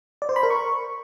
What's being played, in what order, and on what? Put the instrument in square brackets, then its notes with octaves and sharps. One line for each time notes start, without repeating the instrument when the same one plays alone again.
[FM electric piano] D5
C5
B5
A#4
C#6